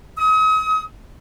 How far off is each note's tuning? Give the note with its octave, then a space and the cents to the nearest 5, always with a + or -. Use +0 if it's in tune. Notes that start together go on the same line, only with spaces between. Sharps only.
D#6 +40